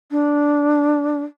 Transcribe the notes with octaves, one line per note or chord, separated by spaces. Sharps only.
D4